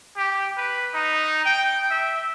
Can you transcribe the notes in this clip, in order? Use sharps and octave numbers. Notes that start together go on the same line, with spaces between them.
G4
B4
D#4
G5
E5